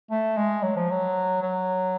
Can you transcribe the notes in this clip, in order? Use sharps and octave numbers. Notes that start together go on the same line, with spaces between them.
A3
G#3
F#3
F3
F#3
F#3